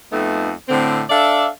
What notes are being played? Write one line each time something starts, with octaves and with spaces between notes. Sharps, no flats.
F2 A3 B3 D#4
A2 D3 C4
D4 A4 D5 E5 F5